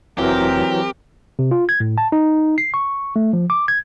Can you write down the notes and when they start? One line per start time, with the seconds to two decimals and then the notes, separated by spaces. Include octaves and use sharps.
0.18 F1 E3 F#3 C4 G4 A#4
1.39 C3
1.51 F4
1.69 G#6
1.80 A2
1.98 A5
2.12 D#4
2.58 C7
2.74 C#6
3.16 A3
3.33 F3
3.50 D6
3.68 G#6